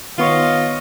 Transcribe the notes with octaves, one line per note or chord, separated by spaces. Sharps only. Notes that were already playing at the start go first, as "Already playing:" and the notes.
D#3 B3 F4 C#5 D#5 C#6